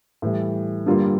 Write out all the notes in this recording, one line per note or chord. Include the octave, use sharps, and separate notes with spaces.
A2 E3 G3
G2 D3 G3 A#3 F4